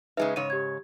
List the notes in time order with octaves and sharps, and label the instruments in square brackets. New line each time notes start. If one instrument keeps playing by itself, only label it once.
[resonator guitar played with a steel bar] C#3 G#3 D#4 [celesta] B4 E5
[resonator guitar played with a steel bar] G#2 C#3 C#5 [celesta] D#7
[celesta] G4 G#6